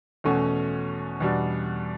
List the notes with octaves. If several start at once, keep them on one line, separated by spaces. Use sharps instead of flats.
E2 B2 A3 C#4 F#4
E2 B2 G3 D4